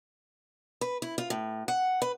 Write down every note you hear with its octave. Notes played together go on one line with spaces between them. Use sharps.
B4
E4
F4
A2
F#5
B4